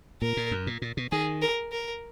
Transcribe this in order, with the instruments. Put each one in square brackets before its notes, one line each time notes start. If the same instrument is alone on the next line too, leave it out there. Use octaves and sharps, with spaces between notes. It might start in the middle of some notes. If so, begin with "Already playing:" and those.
[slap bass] A#2 [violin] A#4
[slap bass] A#2
F#2
A#2
A#2
B2
[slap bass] D#3 [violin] G#4
[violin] A#4
A#4